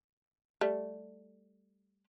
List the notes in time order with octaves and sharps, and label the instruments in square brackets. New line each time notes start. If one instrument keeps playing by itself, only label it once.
[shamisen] G3 A3